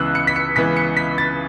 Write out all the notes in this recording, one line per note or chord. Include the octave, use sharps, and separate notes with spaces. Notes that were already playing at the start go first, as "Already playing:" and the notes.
Already playing: C#2 C#3 E3 B3 E6 F#6
C#7
B6
C#7
C#2 C#3 E3 B3 B6
C#7
B6
A6